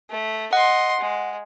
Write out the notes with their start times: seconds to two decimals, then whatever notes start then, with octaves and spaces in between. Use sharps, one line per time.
0.10 A3
0.53 D#5 F#5 C6
1.01 G#3